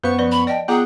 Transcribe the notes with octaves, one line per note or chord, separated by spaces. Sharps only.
F#2 B3 B4 C5 F5 C#6
F3 B4 D5
B5
D5 D#5 G5 A5
B3 F4 G#4 F#5 G5 A#5